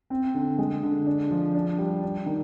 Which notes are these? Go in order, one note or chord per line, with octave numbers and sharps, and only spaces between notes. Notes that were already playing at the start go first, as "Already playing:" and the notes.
C4
D3
G#3
D3
D4
F3
D4
G3
D4
D#3